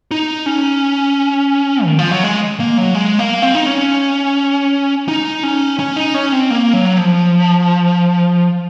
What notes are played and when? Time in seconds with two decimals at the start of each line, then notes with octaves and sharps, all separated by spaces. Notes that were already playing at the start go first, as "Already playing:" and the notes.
0.11 D#4
0.46 C#4
1.85 D#3
1.99 F3
2.11 F#3
2.24 G#3
2.60 A#3
2.78 F#3
2.94 G#3
3.19 A#3
3.42 C4
3.55 D#4
3.66 C#4
5.08 D#4
5.43 C#4
5.79 C#4
5.97 D#4
6.14 C#4
6.32 C4
6.50 A#3
6.73 F#3
6.98 F3